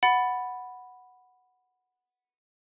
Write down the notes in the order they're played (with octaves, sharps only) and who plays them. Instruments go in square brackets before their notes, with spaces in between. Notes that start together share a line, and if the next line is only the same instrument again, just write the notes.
[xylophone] F#5 B5 A6